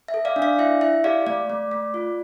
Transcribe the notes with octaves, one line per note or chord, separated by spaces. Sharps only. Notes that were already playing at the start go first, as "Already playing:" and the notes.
E5
A4
D5 F5
D4
D5 F5
E4 E5
E4 E5
G4 D5 F5
A3 D5
A3
A3
F4